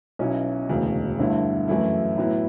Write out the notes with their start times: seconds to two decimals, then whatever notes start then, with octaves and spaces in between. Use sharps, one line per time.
0.19 B1 B2 F#3 C#4 E4
0.69 E1 D2 C#3 E3
1.18 G1 G2 D3 A3 E4
1.68 F#2 E3 A3 E4
2.18 A2 F#3 B3 E4